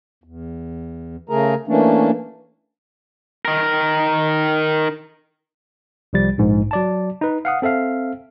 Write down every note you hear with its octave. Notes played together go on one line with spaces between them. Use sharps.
E2
C#3 A3 G#4 A#4 A#5
E3 A3 A#3 C#4 D4
D#3 A#4
C2 F3 G3 A6
A#1 G#2
F#3 D5 A5
D#4 B4
F5 F#5 D#6
C4 A4 E5 F5